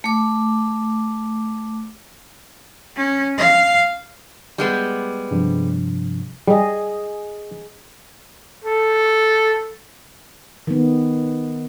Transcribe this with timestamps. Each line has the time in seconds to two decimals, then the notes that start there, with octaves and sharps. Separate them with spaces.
0.04 A3 D6
2.96 C#4
3.38 F5
4.58 G3 G#3 B3
5.31 G2 C3 F3
6.48 G3 G#4 D#5
8.64 A4
10.67 D#3 B3